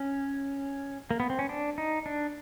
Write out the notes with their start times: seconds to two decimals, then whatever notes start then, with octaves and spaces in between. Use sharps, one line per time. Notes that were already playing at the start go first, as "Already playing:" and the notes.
Already playing: C#4
1.11 A#3
1.20 B3
1.30 C4
1.39 C#4
1.49 D4
1.78 D#4
2.06 D4